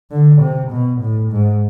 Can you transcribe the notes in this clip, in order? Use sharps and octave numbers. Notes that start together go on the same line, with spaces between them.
D3
C3
B2
A2
G#2